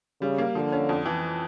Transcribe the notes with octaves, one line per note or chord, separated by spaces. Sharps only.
C#3 G3
A#3
D3 F3
C#4
F2
E3